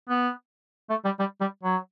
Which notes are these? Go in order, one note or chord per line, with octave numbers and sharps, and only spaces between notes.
B3
A3
G3
G3
G3
F#3